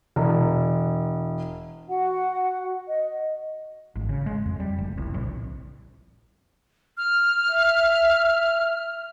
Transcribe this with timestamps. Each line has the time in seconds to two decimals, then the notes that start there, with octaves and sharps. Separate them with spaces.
0.16 E1
1.89 F#4 F#5
2.87 D#5
3.96 G#1
4.09 C#3
4.26 G#3
4.46 F2
4.60 G3
4.78 F1
4.98 C2
5.14 A#1
6.97 F6
7.49 E5